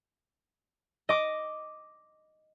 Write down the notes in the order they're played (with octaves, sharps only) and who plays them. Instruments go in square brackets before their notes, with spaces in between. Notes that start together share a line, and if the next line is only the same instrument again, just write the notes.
[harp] D#5 D6